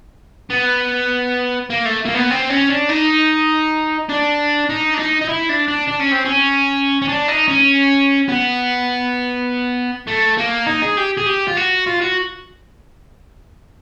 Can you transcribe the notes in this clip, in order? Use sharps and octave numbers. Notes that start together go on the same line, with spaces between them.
B3
A#3
A3
A#3
B3
C4
C#4
D4
D#4
D4
D#4
D4
D#4
D#4
E4
D4
D4
D4
C#4
C4
C#4
C#4
D4
D#4
C#4
B3
A3
A#3
D#4
G#4
G4
G#4
G4
F4
F#4
F4
F#4